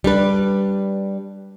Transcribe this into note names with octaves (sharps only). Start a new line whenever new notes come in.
G3 D4 B4